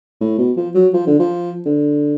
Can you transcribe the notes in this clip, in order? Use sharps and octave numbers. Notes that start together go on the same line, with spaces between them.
A2
B2
F3
F#3
F3
D3
F3
D3